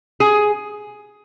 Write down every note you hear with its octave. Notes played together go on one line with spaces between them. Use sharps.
G#4